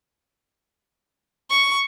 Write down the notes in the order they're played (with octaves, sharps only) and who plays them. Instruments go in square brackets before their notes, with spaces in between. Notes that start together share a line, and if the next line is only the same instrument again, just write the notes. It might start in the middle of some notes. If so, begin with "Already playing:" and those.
[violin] C#6